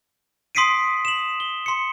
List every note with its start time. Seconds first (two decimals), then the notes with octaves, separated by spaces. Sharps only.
0.55 C6 D#6 B6 C7 D7 D#7
1.05 E7 F#7
1.40 G7
1.66 C6 C#7